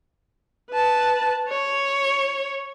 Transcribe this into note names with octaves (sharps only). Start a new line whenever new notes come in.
B4 A5
C#5